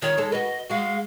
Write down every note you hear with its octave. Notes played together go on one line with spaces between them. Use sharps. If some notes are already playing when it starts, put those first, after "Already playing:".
D#3 F4 C#5
G#3 A4
F#4 B4 D#5
G#3 F#4 F5